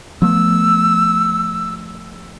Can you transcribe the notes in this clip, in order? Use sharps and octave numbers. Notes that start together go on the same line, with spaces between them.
F3 A3 B3 E6